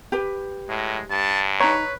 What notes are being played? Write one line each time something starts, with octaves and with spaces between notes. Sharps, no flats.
G4 B4
A2 G#3
G2 A5
D#4 B4 C#5 A#5